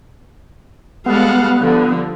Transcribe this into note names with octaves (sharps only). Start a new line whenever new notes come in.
G3 G#3 B3 A4 F5 F#5
D3 F3